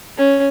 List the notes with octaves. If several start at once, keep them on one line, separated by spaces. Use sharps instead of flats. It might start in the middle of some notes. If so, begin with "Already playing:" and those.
C#4